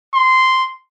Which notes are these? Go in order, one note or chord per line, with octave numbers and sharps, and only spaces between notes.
C6